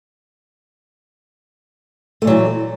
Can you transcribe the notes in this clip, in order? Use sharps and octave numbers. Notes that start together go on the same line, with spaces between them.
A#2 E3 F#3 A3